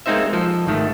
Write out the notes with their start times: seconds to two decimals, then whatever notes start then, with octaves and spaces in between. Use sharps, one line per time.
0.06 G#3 A#3 C4 D#4 C5 E5
0.33 F3 A4 C5
0.67 G#1 D#3 A3